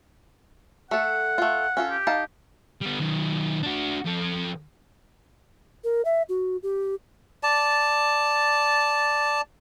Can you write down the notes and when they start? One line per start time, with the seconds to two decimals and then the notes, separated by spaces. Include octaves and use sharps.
0.91 A3 A4 F#5
1.38 A3 F4
1.77 C#4 F4 A4
1.91 G4
2.07 D#4 F5 A5
2.81 G3 B3
2.99 D#3 F#3
3.63 D4 F#4
4.05 F3 A4
5.84 A#4
6.05 E5
6.29 F#4
6.63 G4
7.43 D5 A5